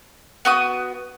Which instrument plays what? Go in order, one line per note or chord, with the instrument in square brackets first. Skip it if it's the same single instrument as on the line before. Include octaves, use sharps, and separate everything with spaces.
[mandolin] B3 F#4 D#6